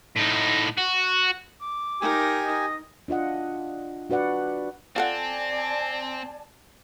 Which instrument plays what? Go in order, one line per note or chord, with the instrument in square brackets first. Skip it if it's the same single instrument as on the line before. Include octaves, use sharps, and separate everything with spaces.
[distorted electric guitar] A2 D#4
F#4
[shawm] D6
[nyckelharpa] D#4 A#4 [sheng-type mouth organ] G4 G#5
[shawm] D#5
[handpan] D4 F4 D#5 F#5
D4 F#4 B4 D5 F#5
[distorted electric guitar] C4 [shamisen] F4 A4 F#5 [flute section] D5 G#5 A5